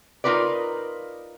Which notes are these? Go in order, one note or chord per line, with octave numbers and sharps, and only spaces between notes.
D#4 F4 A#4 B4 D5